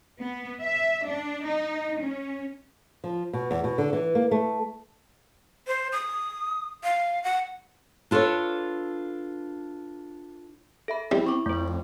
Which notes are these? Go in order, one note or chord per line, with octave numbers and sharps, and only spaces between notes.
B3
E5
D4
D#4
C#4
F3
B2
E2
B2
D3
E3
A#3
A3
C5
D#6
F5
F#5
D4 F4 A4 B4 C#5
A4 E5 B5
G3 C4 E4
C#6 D6
F2 A3 C5